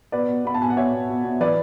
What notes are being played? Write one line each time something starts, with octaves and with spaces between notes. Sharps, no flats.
B2 B4 D5
B2
B2 B5
A5
B2 G#5
F#5
B2 C#5 E5
B2
B2
B2
E3 B4 D5